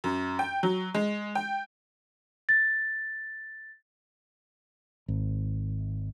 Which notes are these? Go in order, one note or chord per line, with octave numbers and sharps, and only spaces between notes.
F#2
G5
F#3
G#3
G5
A6
G#1